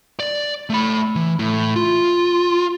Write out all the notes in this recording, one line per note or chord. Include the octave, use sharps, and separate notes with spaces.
D5
A3 B5
E3
A2
F4